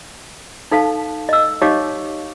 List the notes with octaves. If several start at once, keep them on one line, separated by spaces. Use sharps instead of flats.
D#4 A4 F5 A5
D#5 E6
D#4 G4 C#5 D#5 F5 D6